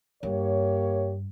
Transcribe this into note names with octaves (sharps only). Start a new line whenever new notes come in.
G2 A#3 G4 C#5